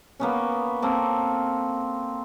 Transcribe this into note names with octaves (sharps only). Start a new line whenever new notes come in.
A#3 B3 C#4
A#3 C4 A4